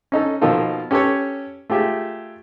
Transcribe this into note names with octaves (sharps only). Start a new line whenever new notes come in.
C#4 D#4 A4
B2 D#3 F3 A#3 F4 A4
C#4 G4 A4 B4 C#5
A3 F4 G4 G#4 E5